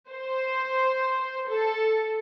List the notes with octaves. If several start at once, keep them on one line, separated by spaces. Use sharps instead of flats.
C5
A4